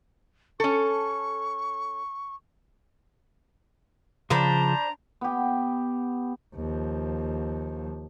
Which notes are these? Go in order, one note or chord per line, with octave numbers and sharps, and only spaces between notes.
C#4 A4 C#6
C#3 F3 D4 G#4 C5 A#5 B5
B3 G4
D#2 F3